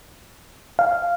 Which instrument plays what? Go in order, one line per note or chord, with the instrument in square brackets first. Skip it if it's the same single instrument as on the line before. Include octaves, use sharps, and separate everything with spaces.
[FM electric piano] F5